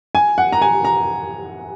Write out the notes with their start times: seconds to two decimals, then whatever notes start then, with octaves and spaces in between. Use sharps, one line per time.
0.15 G#5
0.38 F#5
0.52 A#5
0.62 G#5
0.85 A#5